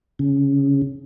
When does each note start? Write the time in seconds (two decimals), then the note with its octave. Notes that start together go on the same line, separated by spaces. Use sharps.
0.19 C#3